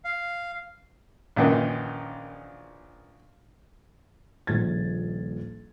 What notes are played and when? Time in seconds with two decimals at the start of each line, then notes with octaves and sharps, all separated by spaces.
0.05 F5
1.36 A#1 F#2 A#2 D#3 E3
4.47 D#1 A#1 G#6 A6